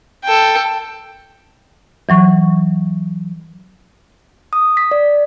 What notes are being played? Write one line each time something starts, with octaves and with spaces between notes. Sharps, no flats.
A4 G5
E3 F#3 C#6
D#6
B6
D5